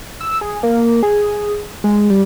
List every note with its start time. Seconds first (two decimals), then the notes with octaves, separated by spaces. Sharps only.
0.21 E6
0.41 G#4
0.63 A#3
1.03 G#4
1.84 G#3
2.10 G3